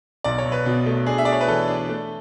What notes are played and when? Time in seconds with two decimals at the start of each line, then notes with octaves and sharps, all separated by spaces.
0.24 B1 D5
0.38 C#5
0.46 B1
0.52 B4
0.66 B2
0.86 A3
1.06 D4 G#4
1.18 E5
1.25 D4 D5
1.32 C#5
1.41 B4
1.48 E3 A4
1.68 D4
1.89 A3